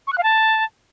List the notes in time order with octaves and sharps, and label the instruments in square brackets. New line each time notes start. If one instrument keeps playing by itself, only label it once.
[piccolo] C#6
F#6
F5
A5